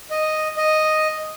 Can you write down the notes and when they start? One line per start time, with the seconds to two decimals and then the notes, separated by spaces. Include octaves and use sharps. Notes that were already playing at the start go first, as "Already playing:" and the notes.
0.11 D#5
0.57 D#5